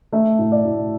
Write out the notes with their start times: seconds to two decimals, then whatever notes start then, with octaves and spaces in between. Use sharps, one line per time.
0.12 A3 E5
0.39 A2
0.52 D5
0.65 A2